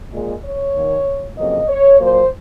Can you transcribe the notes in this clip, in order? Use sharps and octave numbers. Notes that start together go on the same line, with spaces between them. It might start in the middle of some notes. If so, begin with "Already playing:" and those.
A#2 G#3
C#5
D#2 D#3 A#3
F2 C#3 F#3 A#3 D#5
C#5
A#2 F#3 A#3 C5